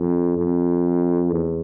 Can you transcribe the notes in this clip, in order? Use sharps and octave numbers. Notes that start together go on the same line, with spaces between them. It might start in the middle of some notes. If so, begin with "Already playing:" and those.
Already playing: F2
F2
E2